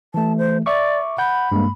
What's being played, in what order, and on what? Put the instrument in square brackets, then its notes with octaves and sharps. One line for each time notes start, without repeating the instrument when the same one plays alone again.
[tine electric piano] E3 A3 [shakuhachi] A5
[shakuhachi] C5
[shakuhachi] D5 [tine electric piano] E5 C#6 D6
[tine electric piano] F#5 G6 [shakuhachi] B5
[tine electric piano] G2 G#3 A#3